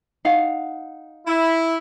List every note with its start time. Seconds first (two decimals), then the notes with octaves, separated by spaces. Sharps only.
0.25 D#4 F5 F#5
1.26 E4